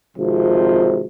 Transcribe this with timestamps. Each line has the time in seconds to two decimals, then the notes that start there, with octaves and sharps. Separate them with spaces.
0.17 G#1 C3 F3